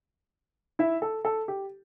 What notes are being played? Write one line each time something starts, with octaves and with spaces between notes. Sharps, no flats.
E4 E5
A4
A4
G4